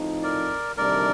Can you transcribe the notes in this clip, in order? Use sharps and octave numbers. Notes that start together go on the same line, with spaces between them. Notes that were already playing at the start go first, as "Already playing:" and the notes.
Already playing: A2 F3 C4 D#4
A#4 D5
D2 C3 D#3 G3 D4 A#4 D5